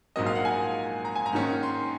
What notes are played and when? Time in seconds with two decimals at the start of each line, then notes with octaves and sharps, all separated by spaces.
0.16 A#1 G#2 F#3 A#3 D#5
0.26 F5
0.35 F#5
0.45 G#5
1.05 A#5
1.16 G#5
1.26 A#5
1.33 G#2 D#3 A#3 C#4
1.63 C6